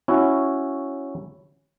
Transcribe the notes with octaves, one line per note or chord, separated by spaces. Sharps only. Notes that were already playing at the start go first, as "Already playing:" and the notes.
C#4 E4 F#4